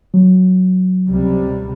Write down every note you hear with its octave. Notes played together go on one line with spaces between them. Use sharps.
F#3
C#2 C3 G3